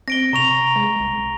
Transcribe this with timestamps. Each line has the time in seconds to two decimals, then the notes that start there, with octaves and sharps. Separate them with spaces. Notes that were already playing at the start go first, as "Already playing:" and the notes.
0.08 C4 A#6 D7 G7
0.33 C3 A#5 C#6 F7
0.76 G#3
1.00 B1